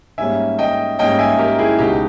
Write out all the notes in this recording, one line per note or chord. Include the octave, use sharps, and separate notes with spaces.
G#2 G3 A#3 C#4 E5 G#5
D#5 G5
G#2 G3 A#3 C#4 D#5 G5
E5 G#5
G4 A#4
E4 G#4
C#2 B2 G#3 B3 D#4 G4